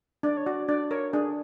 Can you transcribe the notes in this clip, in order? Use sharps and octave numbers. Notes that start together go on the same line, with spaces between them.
D4 D5
C#5
F#4 D5
D4 D5
A#4 C#5
D4 G#4